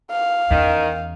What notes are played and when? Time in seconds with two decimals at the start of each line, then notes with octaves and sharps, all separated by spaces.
0.11 F5
0.50 E2 D#3 C#4